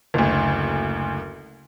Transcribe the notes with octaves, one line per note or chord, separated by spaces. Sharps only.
F#1 D2